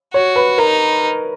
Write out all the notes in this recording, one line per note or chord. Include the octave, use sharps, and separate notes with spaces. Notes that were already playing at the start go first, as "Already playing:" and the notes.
F#4 C#5
B4
D#4 A#4